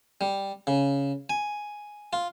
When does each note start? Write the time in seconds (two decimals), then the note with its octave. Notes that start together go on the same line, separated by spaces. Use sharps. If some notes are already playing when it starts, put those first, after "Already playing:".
0.21 G3
0.67 C#3
1.30 G#5
2.13 F4